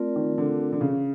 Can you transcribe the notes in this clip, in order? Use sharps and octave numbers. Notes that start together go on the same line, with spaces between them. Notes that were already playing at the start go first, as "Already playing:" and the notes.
Already playing: A3 C4 F4 A#4 D5
D#3
D3
D3
C#3